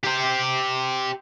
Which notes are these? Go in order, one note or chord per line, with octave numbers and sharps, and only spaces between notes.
G4 C5